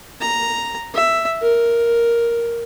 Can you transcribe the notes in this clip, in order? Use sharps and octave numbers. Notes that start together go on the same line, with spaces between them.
A#5
E5
A#4